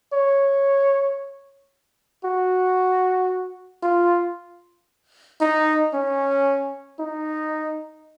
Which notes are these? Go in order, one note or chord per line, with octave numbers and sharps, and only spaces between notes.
C#5
F#4
F4
D#4
C#4
D#4